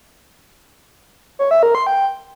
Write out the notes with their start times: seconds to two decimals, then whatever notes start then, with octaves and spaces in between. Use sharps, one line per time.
1.39 C#5
1.51 E5
1.63 A#4
1.75 C6
1.87 G5